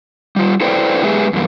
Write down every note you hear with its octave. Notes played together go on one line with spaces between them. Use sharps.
G3 F4
E4 A4 B4 C5 D5 G5
G#3 G4 G#4 B4 E5
E2 G2 A#3